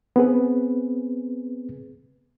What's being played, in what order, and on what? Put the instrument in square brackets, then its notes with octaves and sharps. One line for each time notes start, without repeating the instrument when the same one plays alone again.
[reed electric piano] B3 C4 G#4 B4